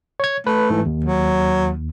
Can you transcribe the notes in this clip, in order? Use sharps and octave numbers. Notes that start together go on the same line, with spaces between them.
C#5 G#6
A3 B4
G#2 E3
D#2
F#3